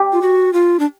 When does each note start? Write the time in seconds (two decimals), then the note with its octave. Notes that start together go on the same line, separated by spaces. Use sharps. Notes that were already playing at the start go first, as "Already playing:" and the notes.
Already playing: G4
0.13 F4
0.22 F#4
0.53 F4
0.80 D4